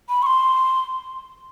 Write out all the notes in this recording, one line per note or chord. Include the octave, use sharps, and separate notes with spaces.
B5
C#6
C6